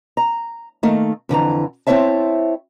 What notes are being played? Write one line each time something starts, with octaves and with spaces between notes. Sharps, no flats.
A#5
D#3 A3 A#3
F2 D3 E3 A#5
C4 E4 C5 C#5 E5 A5